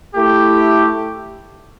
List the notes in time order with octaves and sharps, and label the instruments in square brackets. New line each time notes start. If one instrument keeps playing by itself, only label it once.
[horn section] A3 E4 G4